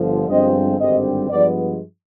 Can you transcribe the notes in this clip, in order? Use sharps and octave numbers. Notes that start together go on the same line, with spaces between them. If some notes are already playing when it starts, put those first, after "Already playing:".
Already playing: G1 D3 F3
G1 G2 F3 G#3 C4 D#5
G#1 G2 D3 G3 C4 D#5
G2 F3 G#3 B3 D5